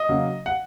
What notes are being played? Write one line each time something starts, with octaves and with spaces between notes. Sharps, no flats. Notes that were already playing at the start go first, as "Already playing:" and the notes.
Already playing: D#5
C#3 F#3 A#3
F#5